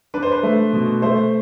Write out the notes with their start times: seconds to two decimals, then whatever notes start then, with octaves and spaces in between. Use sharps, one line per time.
0.14 D4 B4
0.23 C5
0.32 B4
0.43 A3
0.73 B2
1.02 A3 C5